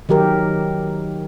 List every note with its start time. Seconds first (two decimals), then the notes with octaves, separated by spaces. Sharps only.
0.09 D#3 F#3 G4 A#4